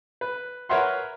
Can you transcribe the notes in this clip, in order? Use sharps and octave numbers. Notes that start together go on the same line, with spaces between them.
B4
A#4 B4 C#5 E5 F#5 C6